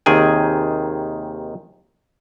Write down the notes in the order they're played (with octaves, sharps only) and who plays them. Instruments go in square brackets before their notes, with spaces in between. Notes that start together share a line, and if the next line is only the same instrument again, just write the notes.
[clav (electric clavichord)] D#2 C3 D#3 G#4 G5 G#5